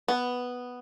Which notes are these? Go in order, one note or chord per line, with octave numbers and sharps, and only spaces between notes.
B3